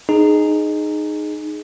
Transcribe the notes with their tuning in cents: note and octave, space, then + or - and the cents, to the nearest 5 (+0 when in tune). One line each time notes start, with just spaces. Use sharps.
D#4 -15 G#4 +10